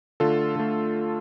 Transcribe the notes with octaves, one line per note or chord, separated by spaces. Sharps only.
D3 A3 F4 A4
D3 A3